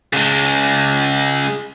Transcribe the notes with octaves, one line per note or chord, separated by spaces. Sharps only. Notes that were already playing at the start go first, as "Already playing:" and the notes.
C#3 G#3